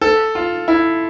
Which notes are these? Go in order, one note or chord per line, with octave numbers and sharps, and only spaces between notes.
A4
F4
E4